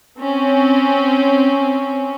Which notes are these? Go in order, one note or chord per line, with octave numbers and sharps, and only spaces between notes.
C4 C#4